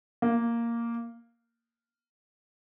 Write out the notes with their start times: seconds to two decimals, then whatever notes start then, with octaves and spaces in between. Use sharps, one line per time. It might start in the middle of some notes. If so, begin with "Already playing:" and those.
0.22 A#3